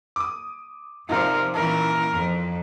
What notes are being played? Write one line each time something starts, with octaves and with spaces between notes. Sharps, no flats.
D6 D#6
C3 F3 D#4 F4 A#4 D5
A#2 E3 C#4 A#4
F2